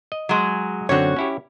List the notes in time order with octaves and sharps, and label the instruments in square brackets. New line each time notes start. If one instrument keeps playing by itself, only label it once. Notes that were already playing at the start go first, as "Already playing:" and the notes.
[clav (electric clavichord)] D#5
[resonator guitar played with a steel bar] F#3 G#3
[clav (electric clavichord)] F#2 D3 C4 [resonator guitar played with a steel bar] F#4 C#5
[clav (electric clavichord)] C#4 E4 G4